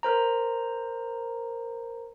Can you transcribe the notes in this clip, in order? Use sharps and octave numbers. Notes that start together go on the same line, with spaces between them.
A#4 C5 A#5